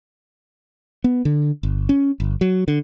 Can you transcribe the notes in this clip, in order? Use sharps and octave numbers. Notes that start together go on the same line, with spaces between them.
B3
D3
G1
C#4
G1
F#3
D3